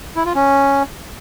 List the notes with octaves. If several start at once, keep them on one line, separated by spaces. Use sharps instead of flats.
E4
F4
C#4